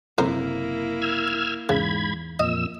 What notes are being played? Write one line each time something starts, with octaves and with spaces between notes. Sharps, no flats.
F#1 F2 C3 A#3 E4 A#4 C5
E6 F6 G#6
E2 G#2 C#3 B5 G#6
F2 A#2 D#5 E6